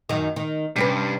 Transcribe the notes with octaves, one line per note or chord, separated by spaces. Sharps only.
F#2 D#3
D#3
G2 C3 C#4 B4